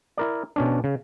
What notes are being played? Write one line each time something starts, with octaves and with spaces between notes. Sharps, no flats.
E4 A#4 D5
B2 C#4 D4
C#3